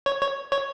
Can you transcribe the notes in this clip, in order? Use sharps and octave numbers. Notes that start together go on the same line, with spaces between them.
C#5
C#5
C#5